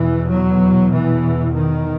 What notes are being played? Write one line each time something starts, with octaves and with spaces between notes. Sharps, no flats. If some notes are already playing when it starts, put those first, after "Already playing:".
Already playing: E2 B2 E3
F#3
E3
D#3